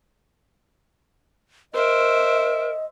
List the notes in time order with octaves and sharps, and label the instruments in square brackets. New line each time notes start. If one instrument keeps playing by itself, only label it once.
[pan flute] A#4 [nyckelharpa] C5 E5 [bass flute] D#5